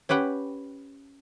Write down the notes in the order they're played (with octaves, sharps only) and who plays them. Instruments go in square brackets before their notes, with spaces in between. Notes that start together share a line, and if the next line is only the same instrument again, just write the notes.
[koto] C#4 G4 B4 F#5 G5